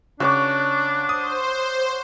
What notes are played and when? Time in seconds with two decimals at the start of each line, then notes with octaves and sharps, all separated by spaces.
0.20 C#3 D4 F#4 C#5 D6
1.09 C5 D#6